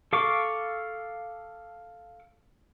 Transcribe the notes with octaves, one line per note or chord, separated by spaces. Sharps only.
A4 F5 C#6 D6